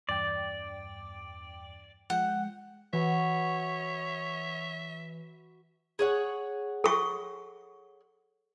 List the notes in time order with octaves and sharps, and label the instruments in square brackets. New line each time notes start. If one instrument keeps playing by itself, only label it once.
[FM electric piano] E2 G2 G5 [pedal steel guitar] D5
[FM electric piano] F3 G#3 G5 [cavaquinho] F#5
[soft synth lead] E3 [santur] F#4 B4 [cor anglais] C#5 [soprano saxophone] E5
[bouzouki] G#4 C#5 F#5
[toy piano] A4 C#6